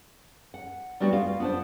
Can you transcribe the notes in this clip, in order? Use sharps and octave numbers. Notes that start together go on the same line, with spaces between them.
F#5
G3 A3 B3 D4 F#4 G4
F4 F5
B3 D4 C5